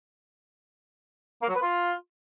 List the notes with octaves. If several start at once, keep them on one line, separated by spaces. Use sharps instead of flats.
A#3
F#3
B4
F4